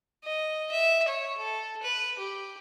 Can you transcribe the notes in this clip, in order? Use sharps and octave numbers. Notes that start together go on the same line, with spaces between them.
D#5
E5
C#5
A4
B4
G4